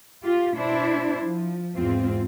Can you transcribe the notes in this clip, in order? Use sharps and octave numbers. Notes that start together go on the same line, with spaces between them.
F4 G4
B2 D4 E4 C5
F3
E2 G#2 C4 F4